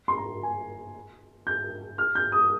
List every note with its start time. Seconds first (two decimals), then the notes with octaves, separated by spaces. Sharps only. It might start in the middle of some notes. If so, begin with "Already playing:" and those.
0.08 C6
0.18 A#5
0.43 G#5
1.47 G6
1.98 F6
2.15 G6
2.32 D#6